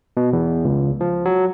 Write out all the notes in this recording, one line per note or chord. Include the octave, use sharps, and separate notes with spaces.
B2
E2
C#2
F3
F#3